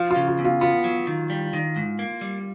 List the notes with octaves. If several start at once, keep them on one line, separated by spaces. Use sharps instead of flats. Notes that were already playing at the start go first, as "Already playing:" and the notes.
Already playing: F3 F4
F4
C#3
F4
E2
F4
B3 F4
F#3
D#3
G3
D#3
G#2
A#3
G3